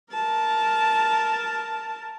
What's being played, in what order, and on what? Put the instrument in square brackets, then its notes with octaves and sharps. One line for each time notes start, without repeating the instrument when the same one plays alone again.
[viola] A#4 A5